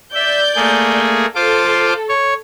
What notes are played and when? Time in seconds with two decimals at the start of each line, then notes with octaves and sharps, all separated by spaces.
0.14 D5 E5 G6
0.56 A3 A#3 G#4
1.35 F4 A4 C5 D6
2.09 C#5